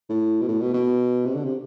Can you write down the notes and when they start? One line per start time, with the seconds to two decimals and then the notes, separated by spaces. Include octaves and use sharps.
0.10 A2
0.41 B2
0.49 A2
0.61 B2
0.74 B2
1.26 C3
1.35 D3
1.45 C3